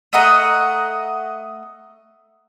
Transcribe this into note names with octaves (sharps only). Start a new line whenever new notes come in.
A3 D#5 F#5 A#5